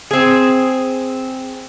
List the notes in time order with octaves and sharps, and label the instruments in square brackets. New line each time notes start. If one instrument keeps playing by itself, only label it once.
[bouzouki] C4 G#4